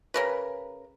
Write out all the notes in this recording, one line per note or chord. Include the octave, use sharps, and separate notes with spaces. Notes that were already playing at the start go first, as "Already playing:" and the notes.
C#3 A#4 B4